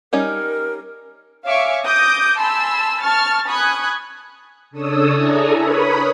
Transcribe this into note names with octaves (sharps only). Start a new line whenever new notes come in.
G3 C#4 D#4 A#4
C#5 E5 F5 G#5 C#6 D6
D6 D#6 G6 A#6
G#5 A5 B5 C6 E6
A5 C#6 F6 A6
G#5 B5 C#6 D#6 F#6 G#6
C#3 D4 A4 C#5 D#6 E6
D4 E4 G#4 A4 G#5 A#5
A#4 B4 C#5 B5 D#6